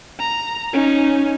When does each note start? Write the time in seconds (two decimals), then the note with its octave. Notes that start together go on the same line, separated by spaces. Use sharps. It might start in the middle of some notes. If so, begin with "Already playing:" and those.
0.19 A#5
0.73 C#4 D#4